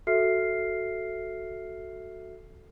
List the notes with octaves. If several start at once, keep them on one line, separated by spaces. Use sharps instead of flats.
F#4 A4 E5 F6 C7